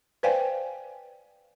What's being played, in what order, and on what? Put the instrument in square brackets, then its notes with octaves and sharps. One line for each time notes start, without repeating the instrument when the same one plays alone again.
[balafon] B4 C5 D5 F5 G5 G#5